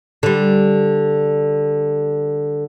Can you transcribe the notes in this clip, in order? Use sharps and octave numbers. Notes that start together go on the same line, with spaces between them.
D3 G3